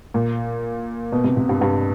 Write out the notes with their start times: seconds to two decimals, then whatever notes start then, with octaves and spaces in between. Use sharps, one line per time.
0.14 A#2
1.12 B2
1.24 C3
1.37 C3
1.49 G2
1.61 G2